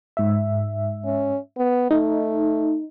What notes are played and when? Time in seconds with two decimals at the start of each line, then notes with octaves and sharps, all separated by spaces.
0.17 G#2 E5
1.05 C#4
1.58 B3
1.91 A3 D#4